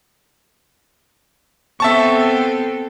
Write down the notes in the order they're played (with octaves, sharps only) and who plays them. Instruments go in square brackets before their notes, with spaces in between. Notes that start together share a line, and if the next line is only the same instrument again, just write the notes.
[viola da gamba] B3 C4 A4 [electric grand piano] E5 A5 C#6